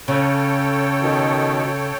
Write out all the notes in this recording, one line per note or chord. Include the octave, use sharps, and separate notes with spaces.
C#3 A4 C#5 G5
B2 D#3